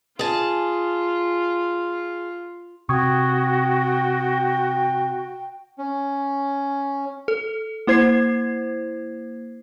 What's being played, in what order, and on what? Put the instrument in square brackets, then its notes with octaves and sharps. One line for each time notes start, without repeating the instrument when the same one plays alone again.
[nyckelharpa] F4 [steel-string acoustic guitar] G#4 A5
[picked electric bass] C3 [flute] F#4 [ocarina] G5 [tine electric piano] C#6 D#6 G#6
[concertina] C#4
[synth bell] A4
A#3 E4 C5 G#6 C7